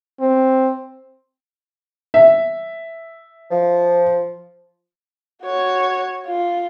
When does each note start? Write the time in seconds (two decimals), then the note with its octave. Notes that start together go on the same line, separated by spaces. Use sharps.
0.20 C4
2.14 E5
3.51 F3
5.44 F#4 C#5
6.26 F4